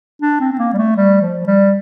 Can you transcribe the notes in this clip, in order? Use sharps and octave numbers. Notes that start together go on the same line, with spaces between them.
D4
C4
C4
A#3
G3
A3
G3
F3
G3